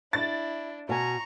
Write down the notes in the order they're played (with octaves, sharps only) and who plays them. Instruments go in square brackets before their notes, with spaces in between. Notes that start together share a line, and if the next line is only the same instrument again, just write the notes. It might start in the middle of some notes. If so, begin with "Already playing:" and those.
[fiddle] D4 [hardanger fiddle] E4 [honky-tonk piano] A6
[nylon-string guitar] B2 G#5 [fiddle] A#5 [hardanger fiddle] C#6